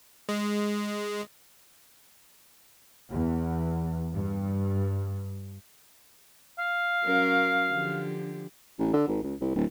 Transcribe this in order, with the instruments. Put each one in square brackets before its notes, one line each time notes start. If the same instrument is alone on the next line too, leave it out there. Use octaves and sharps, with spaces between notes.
[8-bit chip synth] G#3
[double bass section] E2
G2
[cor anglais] F5
[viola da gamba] F#3 C#4 A#4
D3 F3 G4
[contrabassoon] A1
D3
G#1
C#2
C2
D1